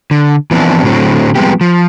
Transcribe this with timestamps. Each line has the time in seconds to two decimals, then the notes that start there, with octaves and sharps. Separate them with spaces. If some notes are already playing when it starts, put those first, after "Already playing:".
0.11 D3
0.51 E3 F3 B3 C4 D4 E4
0.84 A2 D3 F#3 C4
1.35 F3 G3 G#3 B3 C4 G4
1.61 F3